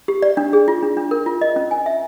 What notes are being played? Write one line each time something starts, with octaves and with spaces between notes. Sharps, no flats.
G4
D5
D4
G#4
F4
D4
D4
A#4
F4
D#5
C#4
G#5
E5